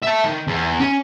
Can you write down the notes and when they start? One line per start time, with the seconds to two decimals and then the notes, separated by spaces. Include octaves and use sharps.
0.03 E5 A5
0.25 D#3
0.47 E2
0.80 C#4